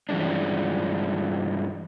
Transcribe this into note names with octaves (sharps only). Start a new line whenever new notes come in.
G2 E3 F3 G#3 C#4 D4